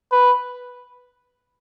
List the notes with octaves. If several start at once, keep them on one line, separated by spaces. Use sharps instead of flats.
B4